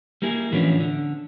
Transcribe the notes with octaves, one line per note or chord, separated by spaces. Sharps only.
G3 A#3 E4 G#4
A2 E3 F3 B3 C#4 D4
D3